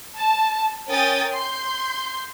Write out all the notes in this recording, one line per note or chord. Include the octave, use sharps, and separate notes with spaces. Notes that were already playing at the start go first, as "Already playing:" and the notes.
A5
C#4 A#4 G5 G#5 D#6 A6
C6 G6